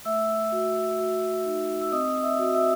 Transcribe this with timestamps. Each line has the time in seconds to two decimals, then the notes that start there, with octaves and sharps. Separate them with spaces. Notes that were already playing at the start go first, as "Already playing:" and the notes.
0.05 A3 E5 E6
0.52 F#4
0.98 F#4
1.46 D#4
1.81 E6
1.92 C4 D#5 D#6
2.23 E5 E6
2.39 F#4
2.54 E5 E6